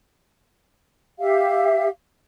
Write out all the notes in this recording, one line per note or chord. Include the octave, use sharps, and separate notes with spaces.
G4 E5 F5